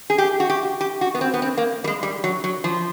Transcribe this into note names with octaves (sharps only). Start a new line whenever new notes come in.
G#4
G4
F#4
G4
G4
F#4
B3
C4
B3
C4
A#3
G3
G#3
G3
F#3
F#3
F3